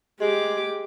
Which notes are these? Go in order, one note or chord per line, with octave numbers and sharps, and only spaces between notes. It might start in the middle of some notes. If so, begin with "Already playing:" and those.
G#3 G4 D6